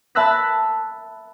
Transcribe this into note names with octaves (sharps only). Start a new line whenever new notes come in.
E5 A5 B5 E6 F#6 A#6